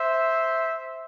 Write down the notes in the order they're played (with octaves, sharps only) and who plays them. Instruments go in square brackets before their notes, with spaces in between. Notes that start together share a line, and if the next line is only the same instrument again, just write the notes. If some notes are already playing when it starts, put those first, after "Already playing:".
Already playing: [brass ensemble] C5 E5